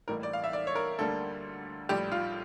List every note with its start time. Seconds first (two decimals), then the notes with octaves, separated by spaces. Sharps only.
0.08 A1 A2 E3 G3 A#3 A#4
0.23 D5
0.33 F5
0.44 E5
0.53 D5
0.67 C#5
0.75 A#4
0.98 D2 D3 G3 A#3 A4
1.89 A#1 A2 G3 G4
2.12 F4